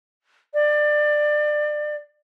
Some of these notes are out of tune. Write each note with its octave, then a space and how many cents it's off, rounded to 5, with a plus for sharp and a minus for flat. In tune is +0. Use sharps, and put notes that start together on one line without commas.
D5 +25